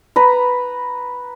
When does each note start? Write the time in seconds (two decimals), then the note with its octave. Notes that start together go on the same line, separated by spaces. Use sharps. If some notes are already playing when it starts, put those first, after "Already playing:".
0.16 B4 A#5 B5